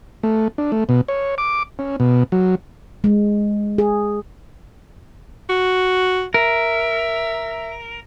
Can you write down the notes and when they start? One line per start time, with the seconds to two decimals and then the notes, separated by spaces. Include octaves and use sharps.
0.23 A3
0.58 D4
0.72 A3
0.89 B2
1.08 C#5
1.38 D6
1.79 C#4
2.00 B2
2.32 F#3
3.04 G#3
3.78 G#4
5.49 F#4
6.34 A#4 E5